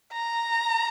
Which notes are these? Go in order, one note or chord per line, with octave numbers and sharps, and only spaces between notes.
A#5